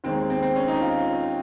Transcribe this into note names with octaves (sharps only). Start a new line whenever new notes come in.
D#2 D#3 G#3 C4
C4
C4
C#4
D#4
F4